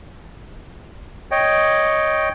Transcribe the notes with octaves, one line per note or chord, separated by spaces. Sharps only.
C#5 D#5 G5